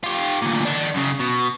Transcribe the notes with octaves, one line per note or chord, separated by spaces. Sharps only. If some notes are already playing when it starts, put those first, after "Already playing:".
F4 G4
D2 A#2
D#3 D4
F#2 C#3
B2